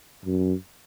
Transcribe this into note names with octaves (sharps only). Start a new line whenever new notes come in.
F#2